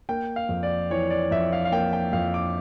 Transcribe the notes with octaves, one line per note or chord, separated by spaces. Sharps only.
A#3 G5
F5
F2
D5
E3 C#5
D5
F2 E5
F5
F5
A#3 G5
G5
F2 F5
D6